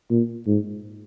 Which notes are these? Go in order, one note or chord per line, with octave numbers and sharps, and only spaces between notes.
A#2
G#2